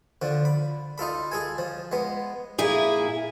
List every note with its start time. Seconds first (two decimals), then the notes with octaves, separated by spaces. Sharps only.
0.22 D3 F3
0.45 B5
0.98 D#4 F4 A4 B5
1.32 G#4 A4 G#5
1.58 F3
1.92 G#3 B3
2.58 A#2 E4 G#4